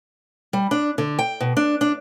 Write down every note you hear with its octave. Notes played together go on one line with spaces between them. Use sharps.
G3
D4
D3
G5
B2
D4
D4